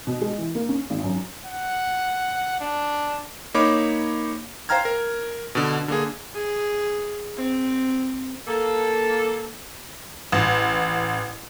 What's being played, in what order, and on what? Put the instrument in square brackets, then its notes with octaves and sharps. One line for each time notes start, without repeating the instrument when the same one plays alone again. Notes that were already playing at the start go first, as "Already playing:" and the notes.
[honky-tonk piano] B2
G#3
E3
A#3
C#4
G#1
F#2
[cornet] F#5
D4
[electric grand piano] A#3 D#4 C#5 B5 D6
C5 F5 G5 A#5 F6 G#6
A#4
B2 D3
D3 A#3 G#4
[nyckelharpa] G#4
C4
[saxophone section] A#3 A4
[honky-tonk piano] A1